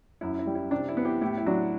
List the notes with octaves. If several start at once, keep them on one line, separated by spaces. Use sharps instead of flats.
F#2 E4
E4
G3
E4
C3 D4
E4
B3
E4 G4
A2 E4 G4
E4
F#3 D4 F#4